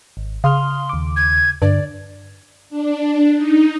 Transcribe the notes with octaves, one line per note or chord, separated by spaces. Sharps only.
G#1
C#3 F5 C6 D#6 F6
D#2 D6
G#6
G2 D3 D5
D4
D#4